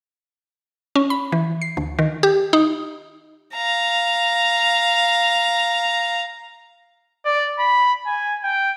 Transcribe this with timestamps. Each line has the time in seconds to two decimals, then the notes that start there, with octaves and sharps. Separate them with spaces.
0.95 C#4
1.10 B5
1.32 E3
1.61 C7
1.77 D2
1.99 D#3
2.23 G4
2.53 D#4
3.54 F5 A#5
7.26 D5
7.59 B5
8.07 G#5
8.44 G5